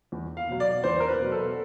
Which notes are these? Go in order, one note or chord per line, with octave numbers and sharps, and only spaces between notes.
E2
F5
B2 F#3
D5
E2 C5
A#4
B4
B2 F#3
A4